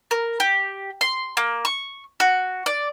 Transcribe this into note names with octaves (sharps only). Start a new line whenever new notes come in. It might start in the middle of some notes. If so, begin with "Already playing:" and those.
A#4
G4
C6
A#3
C#6
F#4
D5